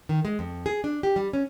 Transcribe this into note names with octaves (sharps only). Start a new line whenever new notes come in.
D#3
G#3
F2
G#4
D4
G4
G3
C#4